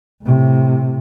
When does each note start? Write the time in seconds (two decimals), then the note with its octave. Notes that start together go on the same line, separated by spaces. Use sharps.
0.23 A2 C3